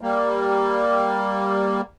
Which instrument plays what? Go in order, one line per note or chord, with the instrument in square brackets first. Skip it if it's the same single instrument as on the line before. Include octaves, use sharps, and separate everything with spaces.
[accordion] G3 A#3